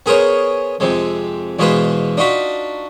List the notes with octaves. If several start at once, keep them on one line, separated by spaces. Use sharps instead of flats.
B3 G#4 A#4 C5 C#5
F2 C3 G#3
E2 B2 G#3 F4 B4 C5
D4 D#4 F4 F#4 B5